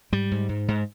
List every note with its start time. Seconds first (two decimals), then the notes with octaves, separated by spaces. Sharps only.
0.12 G#2 G3
0.31 G#2
0.49 G#2
0.68 G#2